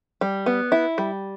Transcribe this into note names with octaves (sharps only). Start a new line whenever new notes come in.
G3
B3
E4
G3